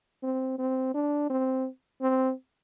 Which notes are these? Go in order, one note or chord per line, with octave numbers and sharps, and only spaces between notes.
C4
C4
D4
C4
C4